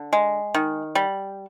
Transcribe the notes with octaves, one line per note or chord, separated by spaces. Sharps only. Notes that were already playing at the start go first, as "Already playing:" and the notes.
Already playing: D3
G#3
D#3
G3